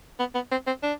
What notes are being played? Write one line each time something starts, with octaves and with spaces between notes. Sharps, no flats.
B3
B3
C4
C4
D4